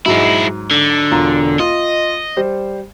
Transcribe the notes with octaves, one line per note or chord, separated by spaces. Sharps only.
G#2 F#3 G#3 E4
D3
E1 F4 A#5
F4 D#5
G3 C5